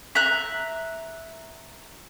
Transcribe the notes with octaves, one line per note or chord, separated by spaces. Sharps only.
E5 A#5 F#6